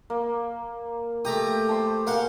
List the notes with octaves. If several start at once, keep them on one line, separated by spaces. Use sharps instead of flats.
A#3
A3 G4 A#5 D#6
C5 E5 A5
A#3 G#4 C5 F5 F#5